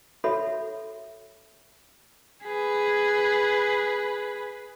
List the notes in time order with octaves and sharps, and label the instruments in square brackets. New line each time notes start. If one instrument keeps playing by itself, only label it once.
[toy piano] F#4 A4 C#5 E5 B5
[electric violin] G#4 B4